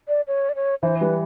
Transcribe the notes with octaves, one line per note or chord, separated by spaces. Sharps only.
D5
C#5
D5
C#5
E3 C5
G3 B4